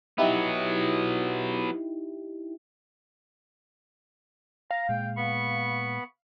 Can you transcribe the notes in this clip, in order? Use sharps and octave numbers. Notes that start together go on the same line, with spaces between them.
F#3 B3 D#4 E4 G4
F5 A#5
A#2 G#3 G5
B3 B5 C#6